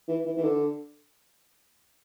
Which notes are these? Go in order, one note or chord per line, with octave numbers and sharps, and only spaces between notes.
E3
E3
E3
D3